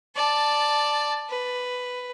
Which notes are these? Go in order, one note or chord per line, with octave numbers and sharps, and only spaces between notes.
D5 A5
B4